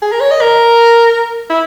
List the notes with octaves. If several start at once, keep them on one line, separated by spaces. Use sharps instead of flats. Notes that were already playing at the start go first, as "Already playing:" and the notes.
G#4
A#4
C#5
D#5
A#4
E4